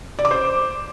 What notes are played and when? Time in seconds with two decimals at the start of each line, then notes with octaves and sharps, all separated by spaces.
0.19 D5
0.25 D6
0.31 C5